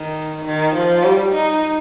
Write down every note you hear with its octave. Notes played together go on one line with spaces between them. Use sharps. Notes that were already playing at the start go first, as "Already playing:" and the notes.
Already playing: D#3
D#3
F3
G3
D#4